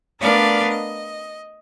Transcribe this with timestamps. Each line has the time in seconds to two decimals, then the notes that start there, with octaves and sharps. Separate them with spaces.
0.20 A3 B3 D4 A#4 D5 F5
0.69 D#5